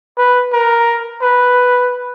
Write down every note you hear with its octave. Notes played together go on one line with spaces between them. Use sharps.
B4
A#4
B4